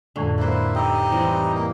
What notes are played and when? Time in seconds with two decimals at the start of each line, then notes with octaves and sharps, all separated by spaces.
0.16 F2 A2 D3 G#3
0.38 A#3 E4 B4 C5
0.75 D#4 G4 D#5 E6
1.12 E3 G3 C4
1.54 A#3